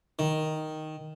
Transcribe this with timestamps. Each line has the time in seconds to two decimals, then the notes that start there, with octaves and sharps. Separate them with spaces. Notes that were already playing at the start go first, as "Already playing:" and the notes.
0.19 D#3